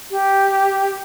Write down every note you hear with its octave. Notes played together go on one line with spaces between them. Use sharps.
G4